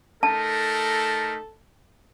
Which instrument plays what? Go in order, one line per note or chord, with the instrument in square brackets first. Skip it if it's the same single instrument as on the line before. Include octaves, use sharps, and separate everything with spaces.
[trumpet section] A3 D#4 A#4 [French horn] A4 [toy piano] A5